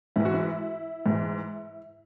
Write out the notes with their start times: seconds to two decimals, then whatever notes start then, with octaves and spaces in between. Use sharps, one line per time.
0.16 G#2 E3 E4
0.25 F#4
0.34 E4
1.06 G#2 E3